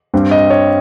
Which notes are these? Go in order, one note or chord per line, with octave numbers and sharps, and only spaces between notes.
G2 G3 C4
D#5
C#5